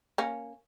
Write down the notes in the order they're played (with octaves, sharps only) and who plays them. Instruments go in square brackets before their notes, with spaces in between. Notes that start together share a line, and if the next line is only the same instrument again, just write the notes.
[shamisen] A#3 C#4